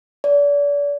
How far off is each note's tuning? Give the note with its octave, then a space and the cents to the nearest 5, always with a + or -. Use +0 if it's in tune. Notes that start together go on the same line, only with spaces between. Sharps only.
D5 -35